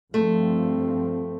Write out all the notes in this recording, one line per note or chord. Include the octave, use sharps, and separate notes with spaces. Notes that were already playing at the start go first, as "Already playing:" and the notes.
G2 F3 A3 C4